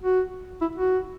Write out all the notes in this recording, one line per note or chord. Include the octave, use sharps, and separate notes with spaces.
F#4
E4
F#4